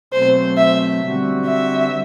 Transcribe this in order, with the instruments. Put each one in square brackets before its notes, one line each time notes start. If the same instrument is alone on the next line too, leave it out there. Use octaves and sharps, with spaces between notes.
[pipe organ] B2 F#3 A3 C4 [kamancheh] C5
[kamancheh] E5
[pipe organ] D3 G3 C4 F#4
[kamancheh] E5